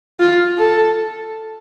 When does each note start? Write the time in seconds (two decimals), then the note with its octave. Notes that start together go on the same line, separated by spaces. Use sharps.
0.20 F4
0.59 A4